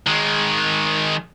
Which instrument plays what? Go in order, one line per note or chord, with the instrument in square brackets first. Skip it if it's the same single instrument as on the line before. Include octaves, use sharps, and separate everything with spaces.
[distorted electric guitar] D#3 G#3